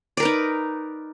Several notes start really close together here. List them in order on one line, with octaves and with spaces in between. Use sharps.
D5 A#4 B4 D#4